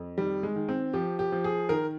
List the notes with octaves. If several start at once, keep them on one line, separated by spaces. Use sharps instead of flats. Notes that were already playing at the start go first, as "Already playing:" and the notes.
Already playing: F2
D#3 G3
G#3
D#3
C4
F3 G4
G4
F3
G#4
D#3 A#4